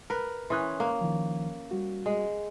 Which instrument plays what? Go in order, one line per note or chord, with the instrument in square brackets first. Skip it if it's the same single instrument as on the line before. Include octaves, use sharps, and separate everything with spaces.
[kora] A#4 B4
[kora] E3 C#4 [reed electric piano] C6 D#6 F#6
[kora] A#3
[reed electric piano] D#3 F3
G3 F#4
[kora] G#3